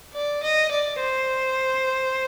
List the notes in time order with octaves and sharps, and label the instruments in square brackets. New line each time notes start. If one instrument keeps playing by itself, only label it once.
[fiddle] D5
D#5
D5
C5